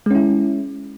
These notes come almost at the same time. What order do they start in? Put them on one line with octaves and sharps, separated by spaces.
G#3 C#4 E4